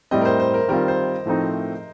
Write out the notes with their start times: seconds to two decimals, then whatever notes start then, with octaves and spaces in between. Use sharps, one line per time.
0.11 A2 G3 C4 D#5
0.21 A#4
0.25 C5
0.40 C5
0.54 A#4
0.68 D#3 G3 C4 F4 A#4
0.88 C5
1.25 A2 F3 A3 C4 D#4